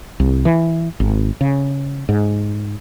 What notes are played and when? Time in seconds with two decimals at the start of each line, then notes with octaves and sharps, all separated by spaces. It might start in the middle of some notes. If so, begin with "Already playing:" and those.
0.20 C2
0.45 E3
1.00 G#1
1.41 C#3
2.09 G#2